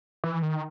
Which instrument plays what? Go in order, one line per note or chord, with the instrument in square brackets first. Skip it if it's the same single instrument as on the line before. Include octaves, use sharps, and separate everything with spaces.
[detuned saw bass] E3
D#3